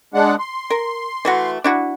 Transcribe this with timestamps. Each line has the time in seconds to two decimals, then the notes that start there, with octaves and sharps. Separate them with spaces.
0.14 G#3 D4 F#5
0.39 C6
0.70 A#4
1.25 E3 A3 F#4
1.64 D4 E4 F#4